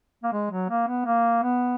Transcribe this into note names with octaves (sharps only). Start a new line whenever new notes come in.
A#3
G#3
F#3
A#3
B3
A#3
B3